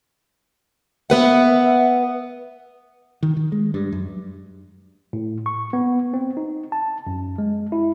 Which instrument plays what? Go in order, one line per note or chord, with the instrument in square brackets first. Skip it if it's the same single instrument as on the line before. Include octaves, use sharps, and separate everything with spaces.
[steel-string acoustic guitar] B3 B4 F#5 [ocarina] E5
[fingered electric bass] D#3
D#3
G#3
G2
F#2
[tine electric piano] A2
C#6
B3
C4
D#4
A5
F#2
G#3
E4